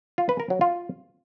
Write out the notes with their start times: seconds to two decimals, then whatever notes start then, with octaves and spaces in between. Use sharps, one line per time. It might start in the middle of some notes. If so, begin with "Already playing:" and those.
0.18 F4
0.29 B4
0.40 A#4
0.50 F#3
0.61 F4